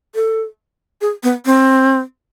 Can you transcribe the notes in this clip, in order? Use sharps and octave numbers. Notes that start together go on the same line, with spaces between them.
A4
G#4
B3
C4